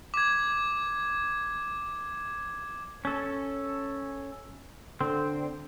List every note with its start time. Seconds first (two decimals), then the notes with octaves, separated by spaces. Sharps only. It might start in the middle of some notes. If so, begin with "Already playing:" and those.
0.14 D6 G#6
3.05 C#4 A4
5.01 D3 C4